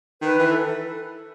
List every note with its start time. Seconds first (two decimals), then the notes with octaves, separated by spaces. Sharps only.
0.22 D#3 B4
0.39 E3
0.48 A4